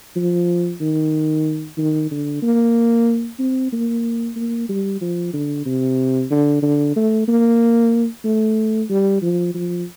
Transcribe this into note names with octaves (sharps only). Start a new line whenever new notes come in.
F3
D#3
D#3
D3
A#3
C4
A#3
A#3
G3
F3
D3
C3
D3
D3
A3
A#3
A3
G3
F3
F3